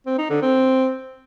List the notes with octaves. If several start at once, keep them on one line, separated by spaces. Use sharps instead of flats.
C4
D#4
D3
C4